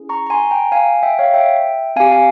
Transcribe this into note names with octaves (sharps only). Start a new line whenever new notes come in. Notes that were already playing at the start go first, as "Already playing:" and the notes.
Already playing: C#4 E4 G#4
A#5 C#6
A#5
G#5 C6
G5 A#5
F5 G#5
E5 G5
C#5 F5
E5 G5
C4 G4 F5 G#5
F5 G#5